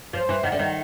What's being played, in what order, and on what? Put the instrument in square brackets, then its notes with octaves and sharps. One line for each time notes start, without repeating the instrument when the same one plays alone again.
[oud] F3 [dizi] C5
[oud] E3
[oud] D#3 [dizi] F#5
[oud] D3
D#3